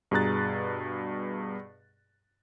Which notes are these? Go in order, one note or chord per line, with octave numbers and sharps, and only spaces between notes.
G2 B2 G#4 A#5 F#6 A6